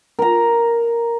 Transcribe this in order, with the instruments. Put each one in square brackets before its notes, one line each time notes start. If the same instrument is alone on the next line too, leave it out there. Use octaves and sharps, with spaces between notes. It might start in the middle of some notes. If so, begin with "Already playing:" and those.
[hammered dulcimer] A#4 A#5